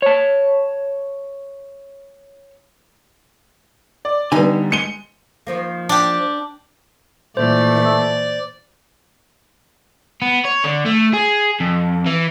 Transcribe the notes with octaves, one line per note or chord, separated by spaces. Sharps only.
C#5 A5
D5
D3 G3 B3 D#4 G#5
G#3 C#7 D#7 G7
D#3 F3 A#3
D4 G4
A#2 E3 A3 C5 D5
B3
C#5
D3
A3
G#4
F2
E3